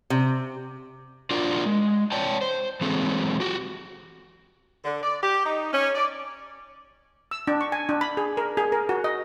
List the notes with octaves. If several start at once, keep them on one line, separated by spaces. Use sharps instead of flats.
C3
D4 F4 F#4 A#4 D5
G#3
C#5 D5 G5 A5
C5
E3 F#3 G#3 C4 G#4 A4
F#4 G4
D3
D5
G4
D#4
C#4
D5
E6
D4
C#6
G#5
D4
B5
G#4
A#4
G#4
A#4
F#4
D#5